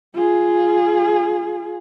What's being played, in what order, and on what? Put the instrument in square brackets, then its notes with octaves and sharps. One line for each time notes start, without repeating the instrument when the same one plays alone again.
[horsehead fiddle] F4 G#4